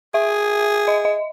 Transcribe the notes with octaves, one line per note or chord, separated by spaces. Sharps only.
G#4 E5
D#5
D#5